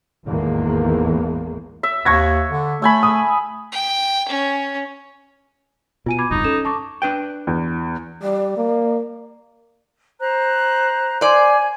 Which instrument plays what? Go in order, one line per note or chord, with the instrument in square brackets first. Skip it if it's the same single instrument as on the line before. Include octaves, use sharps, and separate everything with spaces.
[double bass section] G#1 E2 A2 D#3 G#3 A#3
[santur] E5
[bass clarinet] D#2 [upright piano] C#6 G#6 A#6
[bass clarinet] D3
[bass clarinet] A3 [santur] E5 G#5 B5
[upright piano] D#6
[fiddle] G5
C#4
[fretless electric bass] B2 [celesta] F4 G#5 D#7
[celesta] B5 D6 G#6
[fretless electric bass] F1 D2 G2 [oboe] D#4
[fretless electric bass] C#4 [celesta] A4 E7
[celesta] A5 C#6 D6
[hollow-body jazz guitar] D4 B4 G5
[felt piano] E2
[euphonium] G3 [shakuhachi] D5
[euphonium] A#3
[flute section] C5 A#5 F#6
[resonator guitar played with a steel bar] C5 D5 [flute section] G#5